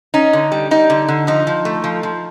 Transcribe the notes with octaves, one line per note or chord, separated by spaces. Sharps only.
C#4 D#4
D3
G3
G3 D#4
D3
D3
F3 D#4
F3
A3
F3
F3